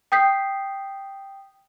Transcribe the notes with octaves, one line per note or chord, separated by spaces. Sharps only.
G5 D#6 G6 B6 C7